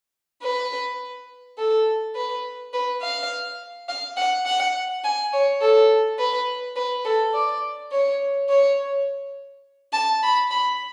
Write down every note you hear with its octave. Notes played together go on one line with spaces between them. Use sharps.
B4
A4
B4
B4
F5
F5
F#5
F#5
G#5
C#5
A4
B4
B4
A4
D5
C#5
C#5
A5
B5
B5